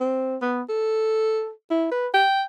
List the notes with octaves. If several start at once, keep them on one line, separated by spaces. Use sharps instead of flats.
C4
B3
A4
E4
B4
G5